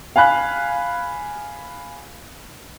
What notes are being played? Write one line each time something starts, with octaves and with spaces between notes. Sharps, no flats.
F5 G#5 B5 F#6